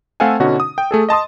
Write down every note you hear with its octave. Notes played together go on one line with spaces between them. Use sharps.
A3 C4 A4 F5 F#5 G#5
B2 D3 C#4 D#4 F#4
D#6
G5
A3 G#4 A4
D#5 A5 C6 D#6